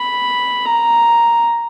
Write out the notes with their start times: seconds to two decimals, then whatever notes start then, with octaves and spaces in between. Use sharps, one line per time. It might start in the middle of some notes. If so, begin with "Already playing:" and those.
Already playing: B5
0.66 A#5